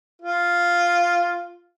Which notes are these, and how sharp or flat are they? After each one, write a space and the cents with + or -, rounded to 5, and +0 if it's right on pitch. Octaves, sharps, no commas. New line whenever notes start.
F4 +0